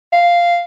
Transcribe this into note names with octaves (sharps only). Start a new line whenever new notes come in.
F5